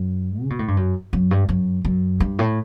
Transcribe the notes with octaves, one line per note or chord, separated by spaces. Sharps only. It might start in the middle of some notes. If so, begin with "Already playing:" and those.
Already playing: F#2
C#3
B2
A2
G2
F#2
F#2
G2
F#2
F#2
G2
A2